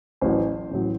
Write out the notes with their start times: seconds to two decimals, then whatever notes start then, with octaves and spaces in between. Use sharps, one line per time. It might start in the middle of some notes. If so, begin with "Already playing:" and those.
0.21 A1 A2 F#3 C5
0.71 A1 A2 F#3